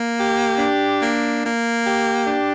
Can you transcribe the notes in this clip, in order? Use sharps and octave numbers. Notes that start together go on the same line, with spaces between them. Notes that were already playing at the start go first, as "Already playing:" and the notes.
Already playing: A#3
G4
D4
A#3
A#3
G4
D4